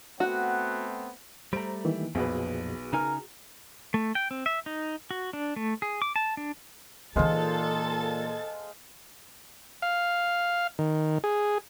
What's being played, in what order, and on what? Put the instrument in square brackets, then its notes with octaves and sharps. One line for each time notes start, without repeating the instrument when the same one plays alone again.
[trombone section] A3 B3 C4 [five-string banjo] F#4 [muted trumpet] F#5
[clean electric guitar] G3 A3 [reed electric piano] C5 A#5 [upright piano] D7
[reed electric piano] D#3 E3 A#3
[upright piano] B1 B4 [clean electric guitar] F2 A#2 [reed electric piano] F#4 G#4
[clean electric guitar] C#3 D#4 G#5 [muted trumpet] A#4
[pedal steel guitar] A3
G5
C4
E5
D#4
F#4
D4
A3
G#4
D6
A5
D4
[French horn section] A#2 [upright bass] E3 D#4 [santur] G#3 C5 F5 [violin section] A4 A6
[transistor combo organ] F5
D#3
G#4